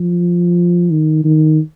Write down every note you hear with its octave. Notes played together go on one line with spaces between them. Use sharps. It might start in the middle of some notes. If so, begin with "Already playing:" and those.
Already playing: F3
D#3
D#3